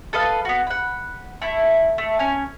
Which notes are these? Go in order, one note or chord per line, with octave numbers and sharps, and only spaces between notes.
A4 B4 D#5 F5
B3 F#4
F#5 B5
A3 E4
A3
C#4 G#5